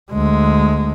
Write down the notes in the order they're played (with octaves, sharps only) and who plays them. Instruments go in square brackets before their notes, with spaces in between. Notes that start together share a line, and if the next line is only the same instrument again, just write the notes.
[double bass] D2 G#3